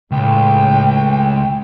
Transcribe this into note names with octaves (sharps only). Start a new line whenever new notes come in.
C#2 A2 G5